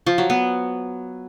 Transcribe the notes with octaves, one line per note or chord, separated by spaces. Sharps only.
F3
F#3
B3